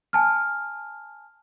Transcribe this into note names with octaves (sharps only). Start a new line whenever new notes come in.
G#5 A5 F6